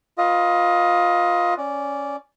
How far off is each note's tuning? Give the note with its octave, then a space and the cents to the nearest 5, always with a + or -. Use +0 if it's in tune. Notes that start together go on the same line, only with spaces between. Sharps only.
F4 +15 B4 -15 D#5 +15
C#4 +0 D5 -15